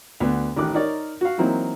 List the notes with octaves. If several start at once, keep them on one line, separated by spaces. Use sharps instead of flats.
D2 B3
A1 D#3 D6 F#6
D#4 A#4 C#5 D5
F#4 F5
E3 F#3 A#3 C4 D#4 E4